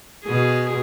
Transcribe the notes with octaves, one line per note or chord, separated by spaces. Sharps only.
B2 G#4